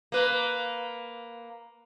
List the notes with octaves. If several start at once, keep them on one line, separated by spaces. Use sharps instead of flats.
A#3 B4